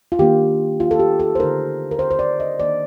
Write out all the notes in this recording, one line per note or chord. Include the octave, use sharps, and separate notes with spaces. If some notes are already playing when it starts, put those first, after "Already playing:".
F4
D#3 A#3 D4 G4
F4
A4
G4
A4
C5
D3 A3 D#4 A#4
A#4
C5
C5
D5
D#5
D#3 A#3 D4 D5